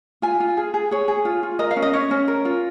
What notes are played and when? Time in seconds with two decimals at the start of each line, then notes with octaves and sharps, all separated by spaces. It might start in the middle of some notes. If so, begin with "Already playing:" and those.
0.22 F4 G#5
0.40 F4
0.57 G#4
0.74 G#4
0.91 G#4 C#5
1.08 G#4
1.25 F4
1.43 F4
1.59 A#4 D#5
1.71 F5
1.77 C#4
1.82 D#5
1.94 C#4 C#5
2.11 C#4
2.28 A#4
2.45 F4